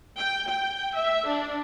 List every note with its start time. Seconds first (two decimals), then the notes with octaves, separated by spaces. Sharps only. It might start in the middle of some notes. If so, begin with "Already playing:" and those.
0.17 G5
0.48 G5
0.94 E5
1.28 D4